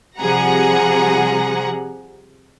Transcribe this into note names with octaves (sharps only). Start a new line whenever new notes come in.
C3 F3 G3 G#4 F#5 A#5